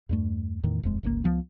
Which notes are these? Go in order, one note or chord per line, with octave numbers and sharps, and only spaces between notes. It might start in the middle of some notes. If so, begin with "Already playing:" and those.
E2 G2 A3
E2 A2 D#3
D#1 F2 G#3
G1 C#2 C3 A#3
C#2 F3 B3